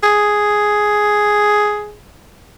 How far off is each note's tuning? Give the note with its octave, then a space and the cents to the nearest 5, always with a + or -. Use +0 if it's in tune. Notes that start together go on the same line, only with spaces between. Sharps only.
G#4 +5